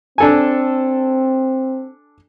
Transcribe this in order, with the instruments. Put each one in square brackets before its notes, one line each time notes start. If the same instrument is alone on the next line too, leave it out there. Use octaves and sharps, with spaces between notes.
[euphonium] C4 [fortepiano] D4 A4 G#5